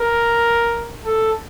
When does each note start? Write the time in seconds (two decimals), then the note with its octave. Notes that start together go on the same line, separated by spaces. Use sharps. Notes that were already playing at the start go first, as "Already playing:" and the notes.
Already playing: A#4
1.04 A4